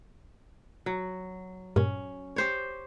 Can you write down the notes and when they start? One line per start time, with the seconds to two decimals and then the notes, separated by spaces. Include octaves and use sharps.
0.86 F#3
1.76 G2 A#2 C#4
2.36 G4 C5 C#5